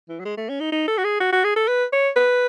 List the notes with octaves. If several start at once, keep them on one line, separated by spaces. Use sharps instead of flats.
E3
F#3
G#3
A3
C#4
D#4
D#4
A4
F#4
G#4
F#4
F#4
G#4
A4
B4
C#5
B4